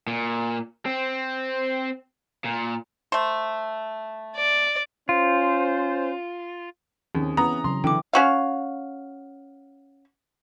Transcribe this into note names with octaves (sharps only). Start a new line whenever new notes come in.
A#2
C4
A#2
A3 C5
D5
C#4 F4 C5
D#2 C4 C#4 G#4
E3 B3 C#4 E4 A#5 D#6
C#3 F#3 C6
D3 E3 E4 G5 D6
C#4 F#4 F5